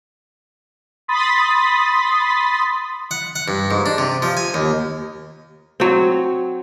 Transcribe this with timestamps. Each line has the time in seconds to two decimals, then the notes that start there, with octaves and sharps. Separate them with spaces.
1.08 B5 C6 D#6 A6 B6
3.11 F#5
3.36 F#5
3.48 G2
3.71 G#2
3.86 D4
3.98 C3
4.22 F3
4.37 G#5
4.54 D#2
5.80 F#3 C4